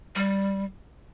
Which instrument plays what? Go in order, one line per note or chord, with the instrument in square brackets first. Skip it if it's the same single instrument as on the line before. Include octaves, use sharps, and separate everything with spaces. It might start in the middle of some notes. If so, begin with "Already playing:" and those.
[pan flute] G3